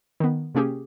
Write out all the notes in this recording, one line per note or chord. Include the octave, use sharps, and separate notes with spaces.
D#3 B3
C3 A#3 C#4 G4 G#4